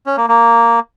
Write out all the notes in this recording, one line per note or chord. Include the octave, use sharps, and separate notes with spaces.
C#4
A#3
A#3